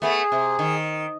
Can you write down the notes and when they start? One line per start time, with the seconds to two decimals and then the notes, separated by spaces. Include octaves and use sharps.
0.02 A3 B3 G#4
0.32 C3
0.59 D#3